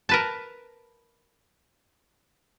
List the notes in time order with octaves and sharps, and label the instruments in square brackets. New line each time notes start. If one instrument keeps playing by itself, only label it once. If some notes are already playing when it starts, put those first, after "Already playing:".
[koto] A#4 B4 A5